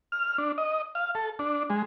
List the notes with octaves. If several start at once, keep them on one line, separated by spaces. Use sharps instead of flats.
F6
D4
D#5
F5
A4
D4
G#3